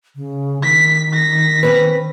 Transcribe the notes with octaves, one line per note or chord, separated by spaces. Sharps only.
C#3
D#3 B6
A#6 B6
C4 C#4 B4